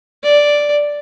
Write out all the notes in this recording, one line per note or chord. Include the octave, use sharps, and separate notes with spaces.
D5